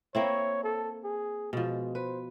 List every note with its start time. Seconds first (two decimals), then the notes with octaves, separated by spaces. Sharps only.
0.15 A#3 C4 E4 C#5
0.64 A4
1.04 G#4
1.53 B2 F3 G#3
1.95 B4 C5